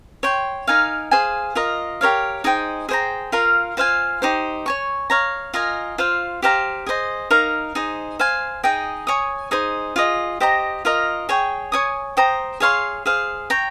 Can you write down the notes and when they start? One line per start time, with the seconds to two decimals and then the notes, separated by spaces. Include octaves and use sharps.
0.23 C#5 G5 C6
0.67 D#4 A#4 F5 G#5
1.11 G#4 C5 F5 G#5
1.55 F4 A#4 D#5
2.01 G4 A#4 C#5 F5
2.44 D#4 G#4 C5 G5
2.89 G#4 C5 G5 A#5
3.32 F4 A#4 F5
3.77 F4 C5 F5 G#5
4.22 D#4 G4 C5
4.66 C#5 G#5 C#6
5.10 C#5 F5 A#5
5.54 F4 A#4 D#5 G#5
5.98 F4 C5 F5
6.42 G4 C5 F5 A#5
6.87 G#4 C5 D#5
7.31 D#4 A#4 F5
7.75 D#4 G#4 C5
8.19 C5 F5 G#5
8.63 D#4 G#4 D#5 G5
9.07 C#5 G#5 D#6
9.51 D#4 G#4 C5
9.96 F4 G#4 D#5
10.40 G4 C5 D#5 A#5
10.85 F4 A#4 D#5
11.29 G#4 C#5 G5
11.72 C#5 G#5 D#6
12.17 C5 G5 A#5 D#6
12.60 G#4 C#5 F5 C6
13.06 G#4 C5 F5
13.50 C#5 G5 A#5